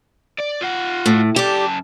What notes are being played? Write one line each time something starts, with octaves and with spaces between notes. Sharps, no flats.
D5
F4 F#5
A2
F#2 G4 D5 A5